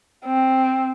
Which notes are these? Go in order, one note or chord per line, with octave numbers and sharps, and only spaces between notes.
C4